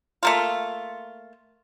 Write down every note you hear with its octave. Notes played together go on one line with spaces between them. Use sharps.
A3 A#3 F4